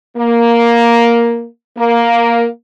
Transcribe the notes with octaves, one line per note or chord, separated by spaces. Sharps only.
A#3
A#3